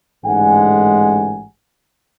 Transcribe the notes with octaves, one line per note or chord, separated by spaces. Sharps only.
A1 G#2 D3 G#3 F#5 G#5